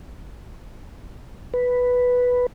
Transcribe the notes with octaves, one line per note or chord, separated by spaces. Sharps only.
B4